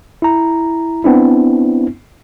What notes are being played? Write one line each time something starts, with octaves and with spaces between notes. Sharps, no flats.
E4 A#5
B3 C4 D4 E4